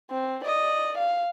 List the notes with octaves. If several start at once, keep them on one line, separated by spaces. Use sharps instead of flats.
C4
D5 D#5
F5